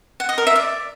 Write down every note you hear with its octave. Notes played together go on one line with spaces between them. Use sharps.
F#5
D#5
A#4
E5
D5